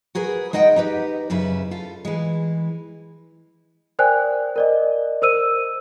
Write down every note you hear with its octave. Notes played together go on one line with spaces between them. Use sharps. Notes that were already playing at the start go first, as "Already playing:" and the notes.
F#4 G#4 A#4 B4
G#3 D#4 D#5 F#5 G5
D#4 G4 B4
F#2 C#3 E4 B4
F4 A4
E3 G#3
A#4 C5 D5 G5 G#5 F#6
A#4 D5 D#5
A#4 C5 E6 D#7